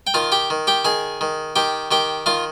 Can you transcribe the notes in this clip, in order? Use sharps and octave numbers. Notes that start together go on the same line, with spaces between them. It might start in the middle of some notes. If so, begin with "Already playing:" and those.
G5
D#3 F4 F5
G4 G5
D#3
G4 G5
D#3 G#4 G#5
D#3
D#3 G4 G5
D#3 G4 G5
D#3 F4 F5